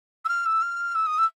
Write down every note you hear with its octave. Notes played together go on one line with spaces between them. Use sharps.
E6
F6
E6
F6
E6
D#6
E6